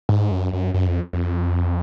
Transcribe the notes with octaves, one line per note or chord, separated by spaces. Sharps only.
G#2
F#2
F#2
F#2
F2
F2